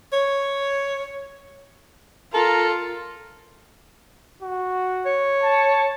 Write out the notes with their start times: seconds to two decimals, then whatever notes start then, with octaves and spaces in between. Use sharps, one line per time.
0.13 C#5
2.34 F4 A4 A#4
4.43 F#4
5.06 C#5
5.43 A5